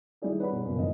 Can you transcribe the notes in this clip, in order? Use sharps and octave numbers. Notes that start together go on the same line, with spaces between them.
D#3 G3 D#4 E4 G#4 D5
B4 C#5 F#5 B5
B2
F#2 A#2 C#3
G#1 G2 B2 D#5